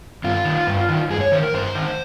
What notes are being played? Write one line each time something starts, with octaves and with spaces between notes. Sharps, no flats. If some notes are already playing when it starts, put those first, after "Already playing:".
G2 F4
D#3
G2
D#3
G2 G#4
C#5
D#3 C5
A#4
G2 C5
D#3